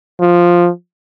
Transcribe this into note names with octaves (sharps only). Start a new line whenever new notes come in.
F3